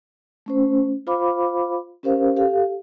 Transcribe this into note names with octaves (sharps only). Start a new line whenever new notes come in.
A3 C#4 C5
F4 C5 F5 B5 D6
C#4 G4 A#4 C5 F5
G4 A4 F5